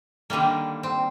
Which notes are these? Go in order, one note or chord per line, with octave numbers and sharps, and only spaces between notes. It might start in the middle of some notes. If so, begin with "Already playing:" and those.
D3 D#3 G3 A#3
C4